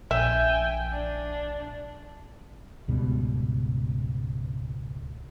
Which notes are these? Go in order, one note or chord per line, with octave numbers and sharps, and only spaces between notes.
A#1 E5 G5 G#5
D4
C#2 G#2 B2 G3